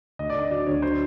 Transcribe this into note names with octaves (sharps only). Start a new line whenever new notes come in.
D2 D#5
D5
D3 D#5
F#3 D5
D2 C#5
C5